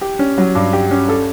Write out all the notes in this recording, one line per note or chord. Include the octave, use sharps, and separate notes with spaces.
G4
C#4
F#3
G2
G4
C#4
A4